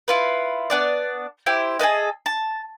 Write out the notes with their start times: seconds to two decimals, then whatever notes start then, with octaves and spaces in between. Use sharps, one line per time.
0.08 E4 F4 B4
0.70 B3 D4 D5
1.46 E4 G4 C5
1.79 G#4 A4 B4 D#5
2.26 A5